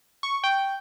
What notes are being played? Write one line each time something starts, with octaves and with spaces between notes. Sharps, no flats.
C#6
G5